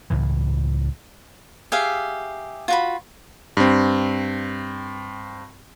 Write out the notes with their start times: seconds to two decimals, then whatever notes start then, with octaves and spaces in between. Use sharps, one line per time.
0.10 C#2 A2 E3
1.72 G4 G#4 E5 F5
2.68 F4 F#4 B5
3.57 G2 C4